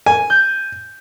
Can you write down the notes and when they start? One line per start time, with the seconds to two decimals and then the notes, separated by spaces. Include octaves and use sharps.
0.06 G#5
0.30 G6